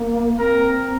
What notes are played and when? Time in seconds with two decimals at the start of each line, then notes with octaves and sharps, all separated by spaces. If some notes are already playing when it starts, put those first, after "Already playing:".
Already playing: A#3
0.39 C4 A#4